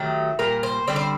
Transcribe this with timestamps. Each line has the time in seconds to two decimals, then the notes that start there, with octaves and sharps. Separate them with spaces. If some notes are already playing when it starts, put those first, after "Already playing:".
Already playing: D#3 F#3 A3 G4
0.39 A#2 G3 A#3 A#4
0.63 C5
0.87 D3 G3 C4 D5
0.96 C5